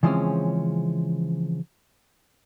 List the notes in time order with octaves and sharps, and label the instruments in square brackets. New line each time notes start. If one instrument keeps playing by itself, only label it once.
[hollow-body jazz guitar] C#3 E3 F3 G#3 C4 C#4